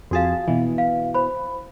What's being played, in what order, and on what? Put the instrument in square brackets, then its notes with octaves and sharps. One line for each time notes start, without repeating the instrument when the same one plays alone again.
[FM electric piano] F2 G#4 A5 [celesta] F#4 F5
[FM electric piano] B2 E3
[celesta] F5
C5 B5